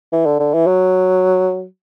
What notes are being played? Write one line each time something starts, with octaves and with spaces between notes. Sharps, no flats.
E3
D3
D3
E3
F#3